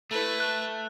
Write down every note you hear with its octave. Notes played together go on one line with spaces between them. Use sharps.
A3 E4 A4 B4
A5 F#6